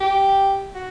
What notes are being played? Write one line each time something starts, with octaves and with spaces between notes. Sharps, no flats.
G4
F#4